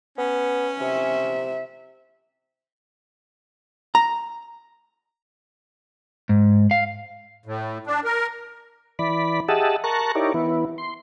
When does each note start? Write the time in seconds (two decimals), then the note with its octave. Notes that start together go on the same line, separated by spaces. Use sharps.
0.18 B3 C#4
0.81 C3 E5
3.95 A#5
6.29 G#2
6.71 F5
7.46 A2
7.87 D4
8.04 A#4
8.99 E3 D5 B5
9.48 G4 G#4 D#5 E5 F#5 A5
9.84 A#4 A5 A#5 C#6 F#6
10.15 D#4 E4 G4 A#4 C#5 D5
10.34 E3 B3 E4
10.78 C6